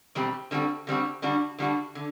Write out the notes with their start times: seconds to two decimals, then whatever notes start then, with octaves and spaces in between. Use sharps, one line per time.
0.15 E2 B2 G3 C4 G4
0.51 D3 G3 C4 F#4
0.87 D3 G3 C4 F#4
1.22 D3 G3 D4 F#4
1.59 D3 G3 D4 F#4
1.95 D3